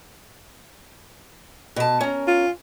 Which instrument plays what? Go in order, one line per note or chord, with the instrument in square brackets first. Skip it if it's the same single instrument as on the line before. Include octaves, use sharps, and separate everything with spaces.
[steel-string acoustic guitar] B2 A5
C#4 A#4
[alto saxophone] F4